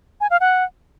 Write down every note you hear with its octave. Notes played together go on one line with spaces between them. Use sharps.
G#5
F5
F#5